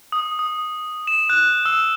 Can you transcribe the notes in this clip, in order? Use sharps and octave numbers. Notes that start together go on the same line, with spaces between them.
D#6
D#6
E7
F#6
E6